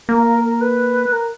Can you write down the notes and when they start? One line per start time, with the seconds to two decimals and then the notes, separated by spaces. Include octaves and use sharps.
0.08 A#3 A#4
0.43 A#4
0.60 B4
1.12 A#4